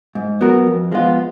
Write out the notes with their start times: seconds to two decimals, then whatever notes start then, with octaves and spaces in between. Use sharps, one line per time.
0.15 G#2
0.41 F#3 B3 F#4 A#4
0.67 F2
0.92 F3 G#3 B3 F4